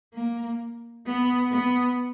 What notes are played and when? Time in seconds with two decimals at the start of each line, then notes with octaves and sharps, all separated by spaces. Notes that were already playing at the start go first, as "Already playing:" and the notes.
0.14 A#3
1.06 B3
1.52 B3